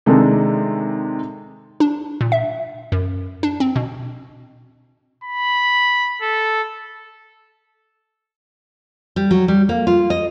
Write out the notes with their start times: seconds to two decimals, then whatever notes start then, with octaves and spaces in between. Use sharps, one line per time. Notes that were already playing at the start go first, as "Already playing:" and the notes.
0.06 C3 D#3 G#3 D4 D#4 A4
1.80 D4
2.21 A#2
2.32 E5
2.92 F#2
3.43 D4
3.60 C4
3.76 B2
5.24 B5
6.22 A4
9.16 G3
9.31 F#3
9.48 G3
9.69 A#3
9.87 F4
10.10 D#5